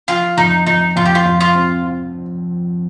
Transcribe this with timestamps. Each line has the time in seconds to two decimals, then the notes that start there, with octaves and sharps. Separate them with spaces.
0.08 F3 F4
0.37 F2 D#4
0.66 F2 D#4
0.96 F2 F4
1.06 G4
1.15 F4
1.26 F2
1.40 F4
1.55 C4